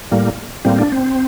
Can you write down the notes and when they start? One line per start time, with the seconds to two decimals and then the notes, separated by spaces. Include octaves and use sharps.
0.11 A2 G3 A#3
0.65 A2 G3 A#3 C4
0.79 D4
0.92 C4